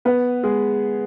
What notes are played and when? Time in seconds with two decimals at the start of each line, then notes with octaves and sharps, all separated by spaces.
0.05 B3 B4
0.43 G#3 G#4